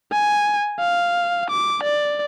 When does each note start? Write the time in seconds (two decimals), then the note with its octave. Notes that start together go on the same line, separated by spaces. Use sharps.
0.12 G#5
0.80 F5
1.50 D6
1.83 D5